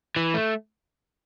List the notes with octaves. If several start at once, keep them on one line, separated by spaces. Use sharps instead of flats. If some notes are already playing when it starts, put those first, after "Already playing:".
E3
A3